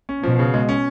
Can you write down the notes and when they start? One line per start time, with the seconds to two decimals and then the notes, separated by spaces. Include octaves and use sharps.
0.09 C#4
0.23 B2 F3
0.39 C#3
0.54 G#3
0.69 C#4